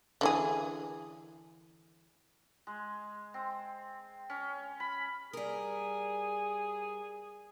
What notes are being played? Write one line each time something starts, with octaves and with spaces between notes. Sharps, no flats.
D3 E3 G#4
G#3
C4
C#4
B5
G3 G#4 A#4